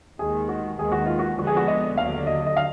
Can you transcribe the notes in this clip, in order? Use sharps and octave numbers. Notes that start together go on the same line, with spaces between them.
D#2 D#3 G#3 G#4
F#4
D#2 D#3 G#3 B3 G#4
F#4
F4
F#4
F2 D3 G#3 B3 F#4
G#4
F#4
D#5
D#2 D3 F#3 F5
D#5
D#5
F5